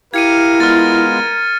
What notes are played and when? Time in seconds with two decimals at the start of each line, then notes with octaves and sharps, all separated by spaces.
0.14 E4 G4 A#4 F5 G#6 C#7 D#7
0.60 G#3 B3 F4 F6 A6